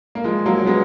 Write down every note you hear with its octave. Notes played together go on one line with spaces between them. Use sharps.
A#3
F3 G#3
F#3 A#3
G#3 B3